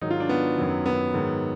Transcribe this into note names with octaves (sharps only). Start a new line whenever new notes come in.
G#2 D#3 F#3 D#4
F4
D4
B3
F#2 D#3 F#3
B3
G#2 D#3 F#3